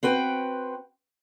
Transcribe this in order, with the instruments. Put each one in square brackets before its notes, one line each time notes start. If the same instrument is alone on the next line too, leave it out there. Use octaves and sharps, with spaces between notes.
[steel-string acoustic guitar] C4 F#4 B4 G5